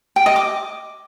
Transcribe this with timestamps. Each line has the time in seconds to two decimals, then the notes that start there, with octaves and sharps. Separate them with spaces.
0.16 G5
0.26 D#5
0.36 D6